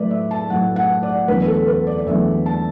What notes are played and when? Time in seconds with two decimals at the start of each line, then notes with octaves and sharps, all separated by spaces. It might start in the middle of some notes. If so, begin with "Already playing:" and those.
Already playing: A2 F#3 A3 B4 D5 E5
0.11 E5
0.31 A5
0.50 A2 F#3 A3 F#5
0.76 F#5
1.03 D5
1.28 E2 D3 F#3 A3 B4
1.48 A4
1.68 B4
1.87 D5
1.98 D5
2.06 E2 D3 F#3 A3 E5
2.46 A5